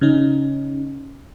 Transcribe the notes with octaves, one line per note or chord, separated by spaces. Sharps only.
C#3 C#4 D#4